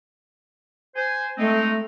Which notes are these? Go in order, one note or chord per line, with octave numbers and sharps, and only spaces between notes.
C5 G#5
G#3 A3 C4 D#4